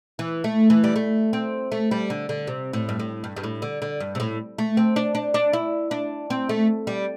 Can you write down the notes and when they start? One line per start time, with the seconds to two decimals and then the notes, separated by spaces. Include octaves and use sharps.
0.19 E3
0.44 A3
0.70 E3
0.84 G3
0.96 A3
1.33 C4
1.72 A3
1.91 G3
2.10 D3
2.29 D3
2.47 C3
2.73 A2
2.89 G2
3.00 A2
3.24 G2
3.37 G2
3.44 A2
3.62 D3
3.82 D3
4.00 G2
4.15 C3
4.20 A2
4.58 A3
4.77 C4
4.96 D4
5.15 D4
5.34 D4
5.53 E4
5.91 D4
6.30 C4
6.49 A3
6.87 G3